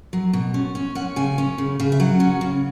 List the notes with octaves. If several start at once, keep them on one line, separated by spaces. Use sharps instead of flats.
F#3
B2
C#4
C#4
C#4 F#5
C#3 G#5
C#4
C#3
C#3
E5
F#3 F#5
C#4
C#3